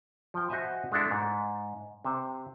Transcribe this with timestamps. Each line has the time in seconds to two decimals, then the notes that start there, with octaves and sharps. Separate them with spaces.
0.34 F3 G5
0.50 F#4 C5 D#5 E5 G#5
0.92 G#3 A3 D4 E4 A4
1.11 G#2
2.05 C3 C5